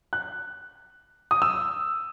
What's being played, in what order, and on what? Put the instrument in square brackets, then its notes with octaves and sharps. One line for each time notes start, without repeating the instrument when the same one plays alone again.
[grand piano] F#6
D#6
E6